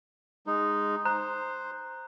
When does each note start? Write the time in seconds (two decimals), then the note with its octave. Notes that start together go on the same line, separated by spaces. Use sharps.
0.47 G#3 D#4
1.05 C5 A#5 F#6